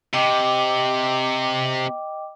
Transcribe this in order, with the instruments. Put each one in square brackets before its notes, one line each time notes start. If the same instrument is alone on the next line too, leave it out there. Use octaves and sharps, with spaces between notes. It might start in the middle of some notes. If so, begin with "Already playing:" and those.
[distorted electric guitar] C3 [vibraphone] D#5 G5 D6